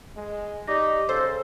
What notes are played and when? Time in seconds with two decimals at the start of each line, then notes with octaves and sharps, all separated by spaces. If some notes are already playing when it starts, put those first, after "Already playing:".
0.16 G#3
0.67 D#4 G4 D5 D6 A#6
1.09 C#3 A4 C5